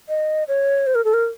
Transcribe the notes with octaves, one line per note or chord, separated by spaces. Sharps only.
D#5
C#5
C5
A#4
A4
A#4